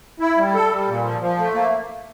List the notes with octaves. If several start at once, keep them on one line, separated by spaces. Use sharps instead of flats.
E4
G3
A4
G3
A#2
F3
F3
A3
A#3